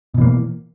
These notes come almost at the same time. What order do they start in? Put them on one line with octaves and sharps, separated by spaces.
B2 E3 A#3